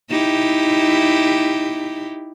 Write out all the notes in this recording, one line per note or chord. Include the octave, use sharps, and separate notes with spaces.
D#4 E4 G4